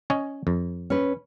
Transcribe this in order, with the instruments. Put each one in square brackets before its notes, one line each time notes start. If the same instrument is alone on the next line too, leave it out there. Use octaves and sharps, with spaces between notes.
[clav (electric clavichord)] C#4 C#5 D#5
F2
[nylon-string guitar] C#4 B4